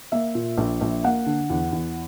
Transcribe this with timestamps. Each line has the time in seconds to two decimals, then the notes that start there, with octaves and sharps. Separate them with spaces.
0.12 A#3 E5
0.35 A#2
0.58 A#1
0.81 A#1
1.04 A#3 F#5
1.26 D3
1.50 E2
1.73 E2